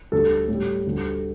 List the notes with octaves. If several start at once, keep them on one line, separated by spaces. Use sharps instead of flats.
D2 D3 G3 A4
A2 G3
D2 D3 G3